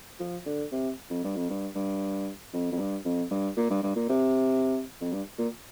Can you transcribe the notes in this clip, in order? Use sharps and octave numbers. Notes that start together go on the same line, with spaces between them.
F3
D3
C3
F2
G2
F2
G2
G2
F2
F2
G2
F2
G2
A#2
G2
G2
A#2
C3
F2
G2
A#2